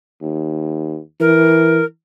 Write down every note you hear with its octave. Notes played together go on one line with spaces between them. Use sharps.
D#2
E3 A#4